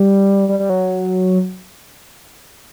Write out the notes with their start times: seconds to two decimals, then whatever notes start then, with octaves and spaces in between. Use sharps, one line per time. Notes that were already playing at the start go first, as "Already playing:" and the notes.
Already playing: G3
0.49 G3
0.59 G3
0.70 F#3